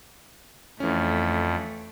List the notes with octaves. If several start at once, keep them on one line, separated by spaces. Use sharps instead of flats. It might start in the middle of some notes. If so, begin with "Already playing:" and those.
F2 E3 A3 C#4